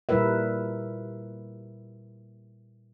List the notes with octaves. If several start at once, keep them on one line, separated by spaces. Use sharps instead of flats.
A#2 G3 E4 A#4 B4 E5